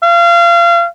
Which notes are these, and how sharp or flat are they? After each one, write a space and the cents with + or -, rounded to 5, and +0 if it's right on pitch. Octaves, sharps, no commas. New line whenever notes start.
F5 -30